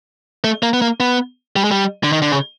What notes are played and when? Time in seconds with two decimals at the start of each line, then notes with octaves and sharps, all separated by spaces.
0.44 A3
0.63 A#3
0.73 B3
0.82 A#3
1.00 B3
1.56 G3
1.64 G#3
1.71 G3
2.04 D3
2.12 D#3
2.22 D3
2.31 C#3